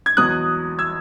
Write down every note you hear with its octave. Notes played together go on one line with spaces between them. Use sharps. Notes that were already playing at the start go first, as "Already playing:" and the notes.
G#6
E2 B2 F#3 D#6 F#6
E6 G#6